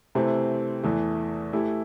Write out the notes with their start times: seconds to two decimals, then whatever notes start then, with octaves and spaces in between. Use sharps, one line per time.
0.15 C3 E3 A3 C4
0.83 E2 E3 A3
1.53 E3 A3 E4 G4